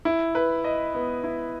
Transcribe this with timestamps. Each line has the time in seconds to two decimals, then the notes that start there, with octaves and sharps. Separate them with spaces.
0.05 E4
0.35 B4
0.64 D#5
0.94 B3
1.24 E4